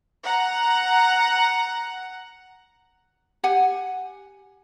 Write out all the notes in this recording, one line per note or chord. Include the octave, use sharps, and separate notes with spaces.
F#5 A#5
G4 F#5 G#5